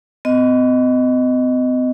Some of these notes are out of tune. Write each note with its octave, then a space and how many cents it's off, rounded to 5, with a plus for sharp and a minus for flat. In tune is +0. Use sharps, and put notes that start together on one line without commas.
C4 -45 D#5 +0